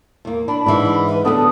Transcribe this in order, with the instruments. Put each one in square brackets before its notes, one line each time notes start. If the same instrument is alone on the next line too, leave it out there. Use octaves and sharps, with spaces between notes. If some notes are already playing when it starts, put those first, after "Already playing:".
[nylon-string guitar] E2 A#3
[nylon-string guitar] D4 [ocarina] B5
[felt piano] G#2 [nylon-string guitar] E3 D4
[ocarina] B4
[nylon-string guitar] D2 D4 [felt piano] B3 A4 [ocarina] D#6